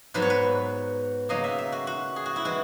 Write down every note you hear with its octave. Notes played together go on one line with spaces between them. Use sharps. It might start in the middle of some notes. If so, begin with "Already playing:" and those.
G#2 F#3 B3 B4
C#5
B4
C#3 F#3 A#3 D#5
E5
E5
F#4
F#4
G#4
F#4
E4
E3 G#3 F#4